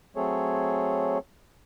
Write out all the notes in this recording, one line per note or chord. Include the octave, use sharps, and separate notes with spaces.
F#3 A3 C4 G#4 A4 C#5